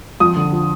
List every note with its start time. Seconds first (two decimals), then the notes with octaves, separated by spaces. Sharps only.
0.20 F2 D#6
0.36 D3
0.52 F3